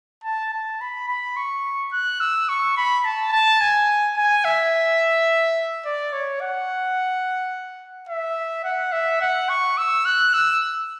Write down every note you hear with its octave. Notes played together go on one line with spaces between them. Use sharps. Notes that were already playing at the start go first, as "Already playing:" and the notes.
A5
A5
B5
B5
C#6
F#6
E6
C#6
B5
A5
A5
G#5
G#5
E5
D5
C#5
F#5
E5
F#5
E5
F#5
C#6
E6
F#6
E6